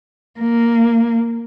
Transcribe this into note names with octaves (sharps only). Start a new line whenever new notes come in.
A#3